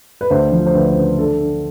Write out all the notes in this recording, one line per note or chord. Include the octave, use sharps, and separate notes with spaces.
B4
D2 C5
F3
C5
D2 B4
C5
C#3 B4
D3 A4
D3